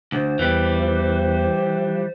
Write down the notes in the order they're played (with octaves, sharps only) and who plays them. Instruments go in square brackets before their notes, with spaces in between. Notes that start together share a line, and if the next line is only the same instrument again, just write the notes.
[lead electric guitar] D2 [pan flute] C5
[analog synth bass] E2 [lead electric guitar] E3 G3